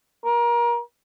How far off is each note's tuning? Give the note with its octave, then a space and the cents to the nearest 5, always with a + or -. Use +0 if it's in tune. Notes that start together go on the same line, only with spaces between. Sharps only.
A#4 +30